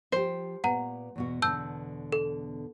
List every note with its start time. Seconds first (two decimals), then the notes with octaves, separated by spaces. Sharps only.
0.12 F3 G4 C5
0.64 A#2 B3 F#5 A#5
1.16 E2 B2 F#4
1.42 E2 B2 D3 A5 E6 G6
2.12 A4